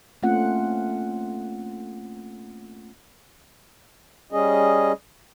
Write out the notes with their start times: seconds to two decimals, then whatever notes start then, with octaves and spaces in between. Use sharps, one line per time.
0.23 A3 A#3 C4 C#4 F4 F#5
4.32 G3 C#4 G#4 D#5